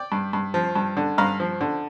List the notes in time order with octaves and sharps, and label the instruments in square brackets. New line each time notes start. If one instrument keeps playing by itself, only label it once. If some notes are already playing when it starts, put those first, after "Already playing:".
Already playing: [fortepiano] D5 G5
G2
G2
F3
G2
D3
G2 F5 A#5
F3
D3